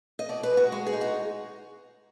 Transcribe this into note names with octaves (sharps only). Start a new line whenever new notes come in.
D#5
B2 D5
B4
G#3
F#4
G#3 F#4
G#4
D#4
F#4